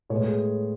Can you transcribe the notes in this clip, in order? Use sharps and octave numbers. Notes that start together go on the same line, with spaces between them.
A2 G#3 B3 C#5
G#4